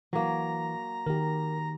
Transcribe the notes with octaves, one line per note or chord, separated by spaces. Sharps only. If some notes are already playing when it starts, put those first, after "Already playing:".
E3 F#3 A#3 A#5
D#3 G4 A#4